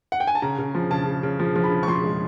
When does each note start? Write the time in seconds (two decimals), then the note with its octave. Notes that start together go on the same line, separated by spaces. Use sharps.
0.12 F#5
0.20 G5
0.27 G#5
0.35 A5
0.42 C#3 A#5
0.58 C#3
0.75 F3
0.91 C#3 A5
1.07 C#3
1.23 C#3
1.40 F3
1.56 F3
1.64 B5
1.72 C#3
1.83 C#6
1.88 F3 C6
2.04 G#3